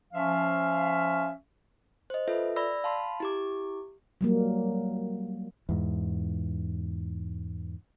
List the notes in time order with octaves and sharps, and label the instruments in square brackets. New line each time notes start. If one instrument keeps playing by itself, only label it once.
[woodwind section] F3 C#4 E5 F5
[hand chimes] C5 D#5
F4 A4 B4 E5
D5 B5 E6 A#6
F5 A5 B5 C6
E4 G4 D6
[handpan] F#3 G3 A#3
[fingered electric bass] E2 G#2